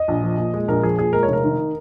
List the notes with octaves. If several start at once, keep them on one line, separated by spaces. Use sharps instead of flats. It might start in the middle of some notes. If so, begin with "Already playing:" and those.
Already playing: D#5
A#1
F3
A#2
G#3
A#1 A#4
F3 G#4
A#2 G#4
G#3 A#4
C#5
F1 A#4
D#3